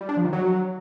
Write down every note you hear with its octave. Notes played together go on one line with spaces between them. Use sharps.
G3
D4
F3
D#3
F#3